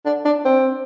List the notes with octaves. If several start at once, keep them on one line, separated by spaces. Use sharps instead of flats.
D4
D4
C4